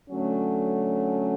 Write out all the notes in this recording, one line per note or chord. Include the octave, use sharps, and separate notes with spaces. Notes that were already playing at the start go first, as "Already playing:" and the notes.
D3 F#3 A3 C#4